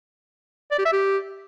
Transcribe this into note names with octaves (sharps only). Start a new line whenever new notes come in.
D5
G4
E5
G4